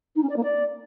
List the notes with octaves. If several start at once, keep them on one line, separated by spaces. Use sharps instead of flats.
D#4
C#4
D5
A#3
D5